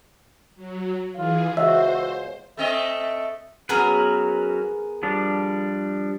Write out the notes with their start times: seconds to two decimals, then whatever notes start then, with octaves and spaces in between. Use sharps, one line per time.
0.56 F#3
1.16 E3 F4 G#4
1.57 C#2 F#4 C5 E5
2.57 A3 C4 D#5 E5
3.69 F#3 B3 C#4 G#4 A#4 B4
5.03 F3 G3 D4